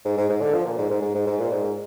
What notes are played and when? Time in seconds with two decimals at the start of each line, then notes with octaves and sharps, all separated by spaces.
0.05 G#2
0.18 G#2
0.30 G#2
0.42 D3
0.54 F3
0.66 A#2
0.78 G#2
0.91 G#2
1.02 G#2
1.15 G#2
1.27 G#2
1.40 A#2
1.52 G#2